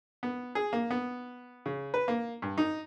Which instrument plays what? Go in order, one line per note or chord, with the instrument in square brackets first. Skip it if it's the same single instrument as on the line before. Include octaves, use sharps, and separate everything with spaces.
[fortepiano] B3
G#4
A#3
B3
C#3
B4
A#3
G2
D#4